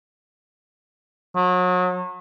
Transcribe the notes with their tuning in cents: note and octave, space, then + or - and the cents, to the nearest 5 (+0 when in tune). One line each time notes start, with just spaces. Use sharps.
F#3 -35